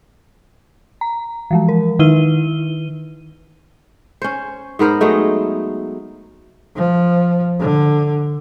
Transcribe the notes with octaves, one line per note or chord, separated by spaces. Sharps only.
A#5
E3 F3 G#3
A#4
D#3 D#4 E4 B4 D#7 G7
C#4 C5
G#2 B3 A#4 C5
F#3 G#3 A3 D#4
F3
D3